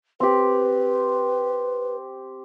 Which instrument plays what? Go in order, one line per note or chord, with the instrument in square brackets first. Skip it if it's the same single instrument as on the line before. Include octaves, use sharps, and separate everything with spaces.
[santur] C4 G4 [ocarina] B4